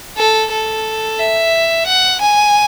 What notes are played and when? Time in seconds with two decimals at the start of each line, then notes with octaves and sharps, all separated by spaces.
0.18 A4
0.51 A4
1.19 E5
1.87 F#5
2.21 G#5